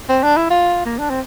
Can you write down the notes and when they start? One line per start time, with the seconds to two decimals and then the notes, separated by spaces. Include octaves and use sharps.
0.09 C4
0.23 D4
0.37 E4
0.50 F4
0.85 A#3
0.99 D4
1.10 C4